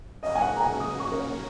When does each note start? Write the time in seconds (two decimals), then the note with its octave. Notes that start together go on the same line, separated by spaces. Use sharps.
0.22 F#2 C#3 A#3 C#4 F#4 D#5
0.35 G#5
0.42 F#5
0.56 A#5
0.61 G#5
0.80 D#6
1.00 C#6
1.12 A#4
1.19 C#5